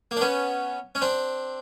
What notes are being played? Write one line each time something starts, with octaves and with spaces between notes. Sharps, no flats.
A#3
D4
B3 C#4
C#4
C4 D4